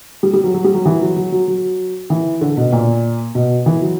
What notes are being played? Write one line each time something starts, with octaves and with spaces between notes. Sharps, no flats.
G3
G3
F#3
F#3
G3
F#3
E3
F#3
F#3
F#3
F#3
E3
D3
B2
A#2
B2
E3
F#3